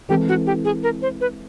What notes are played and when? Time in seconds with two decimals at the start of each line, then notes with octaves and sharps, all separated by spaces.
0.09 E3 G#3 C4 E4 G4 A4
0.29 F#4
0.46 G4
0.65 G#4
0.83 A#4
1.02 C5
1.21 B4